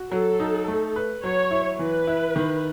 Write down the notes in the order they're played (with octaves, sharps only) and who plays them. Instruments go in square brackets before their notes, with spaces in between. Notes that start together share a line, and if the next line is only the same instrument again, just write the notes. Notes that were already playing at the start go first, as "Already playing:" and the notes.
Already playing: [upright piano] F#4
[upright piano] F#3 [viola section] A4
[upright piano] D#4
A3
B4
[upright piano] F#3 [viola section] C#5
[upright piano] E4
[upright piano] E3 [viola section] B4
[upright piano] E4
D#3